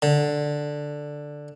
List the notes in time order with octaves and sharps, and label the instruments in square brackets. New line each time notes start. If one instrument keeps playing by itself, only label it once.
[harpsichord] D3